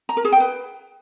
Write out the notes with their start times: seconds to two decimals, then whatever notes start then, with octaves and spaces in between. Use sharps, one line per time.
0.09 A#5
0.17 A#4
0.25 G#4
0.32 G5
0.40 B4